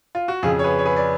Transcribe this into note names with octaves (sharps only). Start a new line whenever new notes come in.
F4
F#4
F2 C#3 F4 G#4
C#5
G#4 B4
C#5
G#4 B4
D5